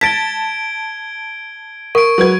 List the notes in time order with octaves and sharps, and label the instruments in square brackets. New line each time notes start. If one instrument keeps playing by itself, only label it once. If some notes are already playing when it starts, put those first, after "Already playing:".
[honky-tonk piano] A5 A6 [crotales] G#6 D7 G7 [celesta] B6
[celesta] A#4 [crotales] C#6 D7
[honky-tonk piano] F#3 B4 G#6